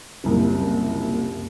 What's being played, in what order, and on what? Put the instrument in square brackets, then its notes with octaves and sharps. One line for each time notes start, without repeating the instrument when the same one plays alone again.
[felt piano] F#1 C2 A#2